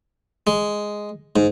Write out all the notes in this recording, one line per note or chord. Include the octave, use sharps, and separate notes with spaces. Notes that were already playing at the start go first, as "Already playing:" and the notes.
G#3
G#2